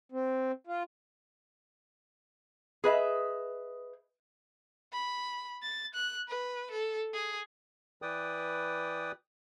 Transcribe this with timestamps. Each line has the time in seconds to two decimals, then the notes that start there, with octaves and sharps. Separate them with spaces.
0.12 C4
0.67 F4
2.84 G#4 B4 D#5 E5
4.93 B5
5.63 A6
5.94 F#6
6.28 B4
6.71 A4
7.13 G#4
8.02 E3 B4 D5 G5 D#6